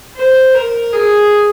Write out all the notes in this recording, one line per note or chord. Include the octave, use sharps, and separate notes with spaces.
C5
A#4
G#4